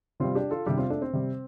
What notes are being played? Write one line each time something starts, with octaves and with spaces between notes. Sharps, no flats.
C3 G3 C4 F4
D4 G4
F4 A4
C3 G3 D4 G4
C4 F4
A3 D4
C4
C3 G3